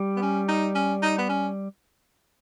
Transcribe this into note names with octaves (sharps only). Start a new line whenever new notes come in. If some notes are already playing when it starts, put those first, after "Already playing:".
Already playing: G3
B3
C#4
D#4
C#4
D#4
B3
C#4